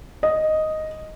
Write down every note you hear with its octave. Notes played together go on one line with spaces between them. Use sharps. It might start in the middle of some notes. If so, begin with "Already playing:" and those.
D#5